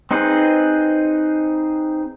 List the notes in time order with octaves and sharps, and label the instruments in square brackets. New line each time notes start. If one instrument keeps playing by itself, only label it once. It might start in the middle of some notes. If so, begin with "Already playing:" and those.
[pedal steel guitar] C4 D#4 G#4 B4 C5